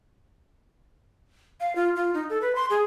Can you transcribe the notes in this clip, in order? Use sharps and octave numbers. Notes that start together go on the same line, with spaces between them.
F5
F4
F4
D#4
A4
B4
C6
G#4